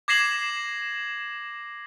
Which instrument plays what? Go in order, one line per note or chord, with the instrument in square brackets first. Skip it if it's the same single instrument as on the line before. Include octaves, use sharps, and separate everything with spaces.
[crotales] D6 G#6 A#6 C7 E7 F#7